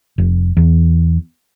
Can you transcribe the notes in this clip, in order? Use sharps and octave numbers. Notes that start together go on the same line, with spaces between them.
F1
E2